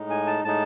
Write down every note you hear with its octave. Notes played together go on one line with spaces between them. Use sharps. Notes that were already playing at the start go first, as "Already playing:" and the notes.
Already playing: A2 G#3 D#4
G#5
A5
A2 G#3 D#4 A5